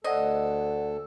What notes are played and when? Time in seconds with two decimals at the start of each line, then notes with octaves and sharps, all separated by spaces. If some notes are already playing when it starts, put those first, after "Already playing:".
0.04 D2 A4 C5 D5 D#5 F#5